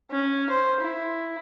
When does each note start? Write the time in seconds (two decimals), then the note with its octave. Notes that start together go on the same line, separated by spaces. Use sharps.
0.11 C#4
0.50 C5
0.80 E4